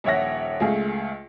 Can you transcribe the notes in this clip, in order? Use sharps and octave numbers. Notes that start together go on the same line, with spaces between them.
D#1 A#1 C#5 E5 F#5 A#6
C#2 A3 G#4 F5